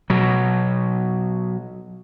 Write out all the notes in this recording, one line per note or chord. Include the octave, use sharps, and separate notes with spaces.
B2 F#3